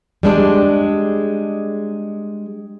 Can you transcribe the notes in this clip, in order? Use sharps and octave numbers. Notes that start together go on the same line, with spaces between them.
G3 G#3 D4